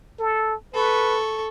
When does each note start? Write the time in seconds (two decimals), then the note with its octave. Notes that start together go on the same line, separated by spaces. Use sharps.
0.19 A4
0.74 A4 B4 C#6